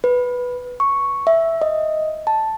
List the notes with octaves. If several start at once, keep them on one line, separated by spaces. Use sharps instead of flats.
B4
C#6
E5
D#5
A5